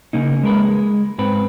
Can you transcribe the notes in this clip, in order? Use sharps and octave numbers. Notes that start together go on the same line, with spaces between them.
C#3 A#3 D#4
G#3 A#4 B4
G#3
G#2 C4 B4